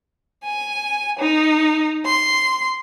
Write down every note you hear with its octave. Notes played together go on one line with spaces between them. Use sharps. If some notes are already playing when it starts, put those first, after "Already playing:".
G#5
D#4
C6